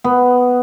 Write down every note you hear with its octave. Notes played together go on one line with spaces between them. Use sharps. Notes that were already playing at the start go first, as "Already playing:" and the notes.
B3